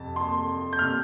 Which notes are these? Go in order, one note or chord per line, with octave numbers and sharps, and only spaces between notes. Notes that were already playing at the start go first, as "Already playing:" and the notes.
Already playing: F2 C3 A5
C6
G6
C3 F6